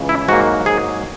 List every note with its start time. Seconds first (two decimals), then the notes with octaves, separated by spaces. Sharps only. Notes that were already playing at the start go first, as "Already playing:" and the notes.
Already playing: C#2 C#3 E3
0.09 E4
0.28 G#2 F#3 A#3 F#4
0.65 G#2 F#3 A#3 G#4